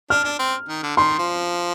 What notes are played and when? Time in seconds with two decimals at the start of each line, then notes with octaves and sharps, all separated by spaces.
0.10 D4 F6
0.24 D4
0.39 C4
0.69 D#3
0.83 D3
0.97 D#3 C6
1.19 F3